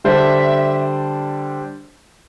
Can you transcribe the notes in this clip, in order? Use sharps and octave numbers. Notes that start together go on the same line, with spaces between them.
D3 G3 D4 C5 E5